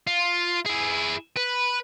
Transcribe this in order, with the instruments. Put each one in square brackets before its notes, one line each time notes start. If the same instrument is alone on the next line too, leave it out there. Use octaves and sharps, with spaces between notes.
[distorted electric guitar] F4
E4 G#4
B4